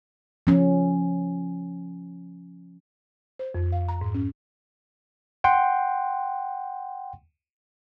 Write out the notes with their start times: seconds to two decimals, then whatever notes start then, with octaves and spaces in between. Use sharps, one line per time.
0.47 F3 C#4
3.39 C5
3.55 F2
3.72 F5
3.88 A#5
4.01 G#2
4.15 C#4
5.44 F#5 G5 C6